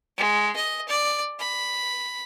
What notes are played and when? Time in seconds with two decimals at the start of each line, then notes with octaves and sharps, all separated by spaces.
0.17 G#3
0.56 D#5
0.88 D5
1.39 B5